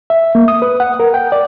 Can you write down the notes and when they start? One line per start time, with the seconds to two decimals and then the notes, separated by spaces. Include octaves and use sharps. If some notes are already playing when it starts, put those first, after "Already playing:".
0.10 E5
0.35 A#3
0.48 D#6
0.62 B4
0.80 F#5
1.00 A#4
1.14 G5
1.32 D5